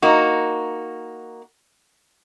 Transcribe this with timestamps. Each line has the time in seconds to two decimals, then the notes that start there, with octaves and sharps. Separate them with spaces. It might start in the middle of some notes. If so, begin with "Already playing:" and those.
0.02 A#3 D#4 F#4